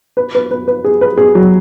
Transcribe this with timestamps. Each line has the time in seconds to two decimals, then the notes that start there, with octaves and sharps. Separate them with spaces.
0.17 B4
0.35 B4
0.51 B4
0.68 B4
0.84 G#4
1.01 B4
1.17 G#4
1.35 F#3